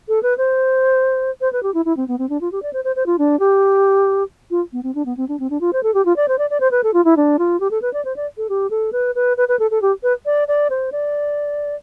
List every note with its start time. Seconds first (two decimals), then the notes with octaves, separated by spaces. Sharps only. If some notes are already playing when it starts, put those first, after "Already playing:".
0.08 A4
0.23 B4
0.38 C5
1.41 C5
1.53 B4
1.63 G4
1.74 E4
1.85 E4
1.97 C4
2.08 B3
2.18 C4
2.29 D4
2.41 F4
2.52 G4
2.62 D5
2.73 C5
2.84 C5
2.96 C5
3.06 F4
3.18 D4
3.39 G4
4.51 F4
4.73 B3
4.83 C4
4.95 D4
5.05 B3
5.17 C4
5.28 D4
5.40 C4
5.50 D4
5.61 F4
5.73 C5
5.83 A4
5.94 G4
6.05 F4
6.16 D5
6.28 C5
6.38 D5
6.50 D5
6.60 C5
6.71 B4
6.83 A4
6.93 F4
7.05 E4
7.17 D4
7.39 F4
7.60 G4
7.71 A4
7.82 B4
7.93 D5
8.05 C5
8.16 D5
8.37 A4
8.49 G4
8.70 A4
8.92 B4
9.15 B4
9.37 B4
9.48 B4
9.59 A4
9.71 A4
9.82 G4
10.03 B4
10.25 D5
10.48 D5
10.70 C5
10.92 D5